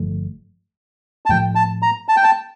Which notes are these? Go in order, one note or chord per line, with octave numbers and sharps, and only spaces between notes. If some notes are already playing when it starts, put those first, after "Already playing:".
Already playing: G1 G2 F3 A3
A5
A2 F3 A3 G5
A5
A#5
A5
G5
A5